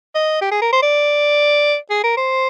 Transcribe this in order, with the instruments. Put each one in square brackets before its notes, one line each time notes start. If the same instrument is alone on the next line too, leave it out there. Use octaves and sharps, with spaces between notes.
[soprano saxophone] D#5
G4
G#4
A#4
C5
D5
G#4
A#4
C5